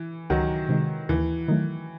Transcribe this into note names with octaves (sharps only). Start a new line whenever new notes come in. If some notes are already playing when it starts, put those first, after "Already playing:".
Already playing: E3
C#2 D#3 F#3
C3 D#3 G#3
D#2 E3
D#3 F#3 A3